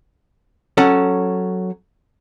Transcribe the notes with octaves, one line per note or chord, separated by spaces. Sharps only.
F#3 C#4 A4 F#5